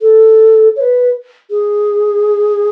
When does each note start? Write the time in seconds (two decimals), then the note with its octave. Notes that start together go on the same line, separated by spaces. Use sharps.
0.01 A4
0.76 C#5
0.81 B4
1.50 G#4